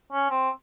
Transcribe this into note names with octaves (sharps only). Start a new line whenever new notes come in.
C#4
C4